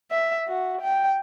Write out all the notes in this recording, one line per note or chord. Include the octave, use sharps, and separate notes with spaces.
E5
F#4
G5